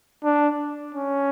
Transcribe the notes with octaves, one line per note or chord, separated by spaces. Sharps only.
D4
C#4